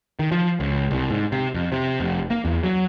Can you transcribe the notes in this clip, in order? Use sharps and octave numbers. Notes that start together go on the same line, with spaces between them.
D#3
F3
C#2
C2
G#2
C3
F2
C3
F1
A#3
E2
F#3